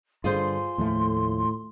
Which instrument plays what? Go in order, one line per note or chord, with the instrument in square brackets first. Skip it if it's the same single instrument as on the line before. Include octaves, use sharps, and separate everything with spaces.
[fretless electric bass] G2 D3 [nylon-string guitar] F4 G#4 C5 [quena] C6
[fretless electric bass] D#2 F3 A3 [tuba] A2